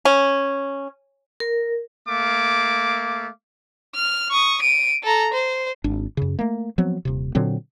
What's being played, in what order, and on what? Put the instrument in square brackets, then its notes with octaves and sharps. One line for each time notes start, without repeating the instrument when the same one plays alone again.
[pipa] C#4
[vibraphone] A#4
[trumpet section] A3 A#3 F5 D6
[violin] F6
C#6 D#6
D7 D#7
A4 A#5
C5
[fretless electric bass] G#1 D4
F#2 C#3
A3 A#3
F3 F#3 B3 C4
D#1 C3
A#2 D3 F#3 C4